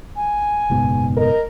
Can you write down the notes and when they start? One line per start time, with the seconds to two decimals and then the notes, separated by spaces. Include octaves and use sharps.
0.16 G#5
0.70 F#1 G#2 B2
1.17 A#4 D#5